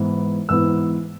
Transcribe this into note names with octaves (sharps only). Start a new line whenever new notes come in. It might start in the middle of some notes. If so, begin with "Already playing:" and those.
Already playing: G#2 E3 B3 E4
G#2 E3 B3 E4 E6